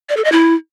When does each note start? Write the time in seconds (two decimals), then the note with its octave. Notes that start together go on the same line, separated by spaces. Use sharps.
0.09 D5
0.17 A4
0.24 D#5
0.32 E4